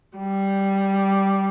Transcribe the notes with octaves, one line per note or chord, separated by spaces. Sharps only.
G3